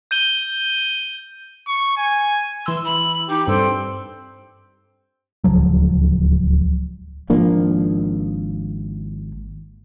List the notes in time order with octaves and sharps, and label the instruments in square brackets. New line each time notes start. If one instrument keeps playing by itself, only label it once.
[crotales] G6 D#7 G7
[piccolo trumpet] C#6
G#5
[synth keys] E3 E6 [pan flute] C6
[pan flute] B5
[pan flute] D#4 [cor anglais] G4
[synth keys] G2 [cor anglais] C4 [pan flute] A4
[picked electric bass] D1 C#2 F3 F#3
[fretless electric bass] G#1 F3 A#3 D4